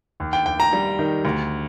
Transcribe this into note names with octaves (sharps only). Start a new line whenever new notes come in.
D#2
G5
D#2 G5
A#5
G3
D#3
D2